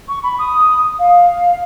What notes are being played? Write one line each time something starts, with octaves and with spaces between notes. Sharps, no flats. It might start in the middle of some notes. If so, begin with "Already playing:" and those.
C#6
B5
D#6
F5